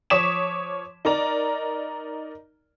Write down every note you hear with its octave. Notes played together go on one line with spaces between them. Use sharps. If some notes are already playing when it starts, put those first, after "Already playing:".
F3 C#5 D6 D#6 B6 E7
D#4 A#4 D5 A#5